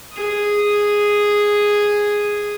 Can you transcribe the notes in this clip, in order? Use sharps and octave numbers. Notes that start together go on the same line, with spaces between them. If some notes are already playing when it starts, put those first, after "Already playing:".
G#4 D#6